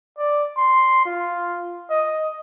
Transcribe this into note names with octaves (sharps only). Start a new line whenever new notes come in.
D5
C6
F4
D#5